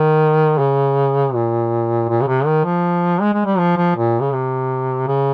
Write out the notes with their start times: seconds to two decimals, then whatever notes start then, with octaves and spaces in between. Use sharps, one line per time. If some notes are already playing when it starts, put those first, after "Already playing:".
Already playing: D#3
0.59 C#3
1.34 A#2
2.09 A#2
2.21 C#3
2.27 C3
2.46 D#3
2.64 F3
3.21 G#3
3.33 G#3
3.45 G3
3.58 F3
3.77 F3
3.96 A#2
4.21 C#3
4.33 C3
5.07 C#3